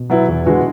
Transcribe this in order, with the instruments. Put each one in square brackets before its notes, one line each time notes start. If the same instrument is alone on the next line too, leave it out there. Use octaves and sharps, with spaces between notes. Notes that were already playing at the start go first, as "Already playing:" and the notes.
Already playing: [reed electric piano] B2
[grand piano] F#3 B3 E4
E2
D3 G#3 B3 F#4